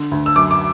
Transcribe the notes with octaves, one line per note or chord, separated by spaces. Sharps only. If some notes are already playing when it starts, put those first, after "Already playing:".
Already playing: D3
D2
E6
F#2 D6
D6